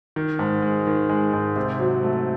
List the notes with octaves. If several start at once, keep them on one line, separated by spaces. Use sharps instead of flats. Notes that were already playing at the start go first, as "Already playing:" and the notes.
D#3
G#2
G#3
D#3
G#3
G#2
C3
F#3
A3